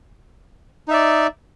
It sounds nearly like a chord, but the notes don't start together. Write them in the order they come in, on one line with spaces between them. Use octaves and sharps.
D#4 E5 D5